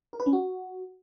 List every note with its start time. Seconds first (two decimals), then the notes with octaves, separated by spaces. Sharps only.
0.13 A#4
0.20 B4
0.26 C#4
0.33 F#4